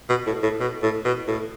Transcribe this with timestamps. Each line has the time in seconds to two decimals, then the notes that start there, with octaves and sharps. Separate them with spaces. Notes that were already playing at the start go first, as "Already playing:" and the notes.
0.09 B2
0.27 A2
0.43 A2
0.60 B2
0.82 A2
1.05 B2
1.27 A2